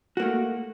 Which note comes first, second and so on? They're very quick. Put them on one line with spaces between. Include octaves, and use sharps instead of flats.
F#4 A#3 A3